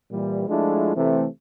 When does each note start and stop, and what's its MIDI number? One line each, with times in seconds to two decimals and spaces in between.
0.11 0.46 46
0.11 0.46 52
0.11 0.46 55
0.49 0.91 53
0.49 0.91 56
0.49 0.91 57
0.49 0.91 62
0.49 0.91 64
0.49 0.91 65
0.95 1.26 48
0.95 1.26 52
0.95 1.26 57